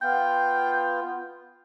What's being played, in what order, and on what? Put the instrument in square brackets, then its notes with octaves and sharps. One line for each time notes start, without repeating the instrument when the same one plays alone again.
[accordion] B3 F4 [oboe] G5